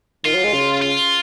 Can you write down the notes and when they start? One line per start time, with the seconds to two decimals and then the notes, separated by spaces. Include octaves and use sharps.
0.25 D#3 F4
0.35 F#3
0.44 G#3
0.53 C#3
0.82 F4